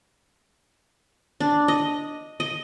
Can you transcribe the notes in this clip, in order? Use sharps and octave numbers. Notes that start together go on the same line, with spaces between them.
D4
D#5
D#5